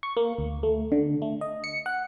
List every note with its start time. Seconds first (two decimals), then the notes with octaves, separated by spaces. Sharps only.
0.03 C#6
0.17 A#3
0.38 D2
0.63 A3
0.92 D3
1.22 A3
1.41 D#5
1.64 C#7
1.86 F#5